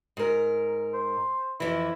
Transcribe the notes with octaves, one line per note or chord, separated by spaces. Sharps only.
G#2 A#4
C5
F2 E3 E4